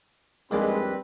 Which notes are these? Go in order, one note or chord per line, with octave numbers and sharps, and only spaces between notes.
A#1 D#2 G3 G#3 C4 B4 D5